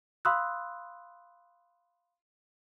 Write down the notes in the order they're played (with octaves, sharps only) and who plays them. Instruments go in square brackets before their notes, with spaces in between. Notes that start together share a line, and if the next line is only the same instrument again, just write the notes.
[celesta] F5 B5 C6 D#6 E6 F#6